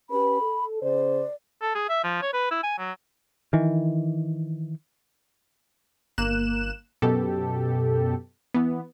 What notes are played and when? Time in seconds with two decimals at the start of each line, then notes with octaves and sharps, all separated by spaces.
0.10 C#4 G4 B4 B5
0.42 A4
0.81 C#3 C5 D5
1.62 A4
1.75 G#4
1.89 E5
2.03 F3
2.22 C#5
2.33 B4
2.51 E4
2.63 G#5
2.78 F#3
3.53 D#3 E3
6.18 G1 A#3 F#6 E7
7.02 F#2 B2 G4 A4
8.54 E3 B3